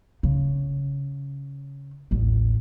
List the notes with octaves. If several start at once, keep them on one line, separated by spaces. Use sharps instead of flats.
C#3
A1 D#2